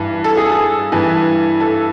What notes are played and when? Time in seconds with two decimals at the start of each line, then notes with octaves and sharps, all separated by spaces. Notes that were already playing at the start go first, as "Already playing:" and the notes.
Already playing: G2 E3
0.24 A4
0.37 G#4
0.52 A4
0.92 G2 E3
1.60 A4